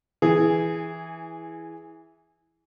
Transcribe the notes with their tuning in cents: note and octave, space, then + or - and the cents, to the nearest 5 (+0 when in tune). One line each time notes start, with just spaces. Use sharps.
E3 +0 G#4 +0